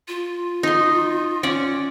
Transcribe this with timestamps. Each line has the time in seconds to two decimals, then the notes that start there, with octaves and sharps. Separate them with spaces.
0.08 F4
0.63 D#4 C6
1.43 C#4 D5 F#5